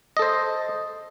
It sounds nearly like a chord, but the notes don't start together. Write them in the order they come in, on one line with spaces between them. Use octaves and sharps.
D#5 A4 C5